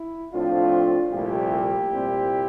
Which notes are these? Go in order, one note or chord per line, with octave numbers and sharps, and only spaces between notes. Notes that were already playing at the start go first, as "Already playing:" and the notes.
Already playing: E4
A2 F3 C4 D4 F4
C2 A#2 F3 A3 E4 G4
C2 A#2 G3 C4